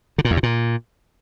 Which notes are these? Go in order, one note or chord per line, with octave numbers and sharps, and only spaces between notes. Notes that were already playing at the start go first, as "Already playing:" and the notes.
D3
A#2
E2
C3
A#2